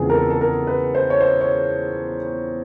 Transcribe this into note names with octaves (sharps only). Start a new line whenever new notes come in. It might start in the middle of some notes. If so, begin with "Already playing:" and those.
Already playing: E2 C#3 F3 G#3 C4 G#4
A#4
A4
A4
A#4
B4
C5
C#5
C5
C#5